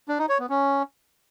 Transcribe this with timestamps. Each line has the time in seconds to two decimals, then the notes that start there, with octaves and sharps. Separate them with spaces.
0.08 D4
0.19 D#4
0.29 C#5
0.39 B3
0.49 C#4